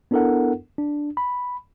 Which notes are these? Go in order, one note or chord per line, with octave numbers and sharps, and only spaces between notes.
B3 D4 E4 A4 A#4 F#5
D4
B5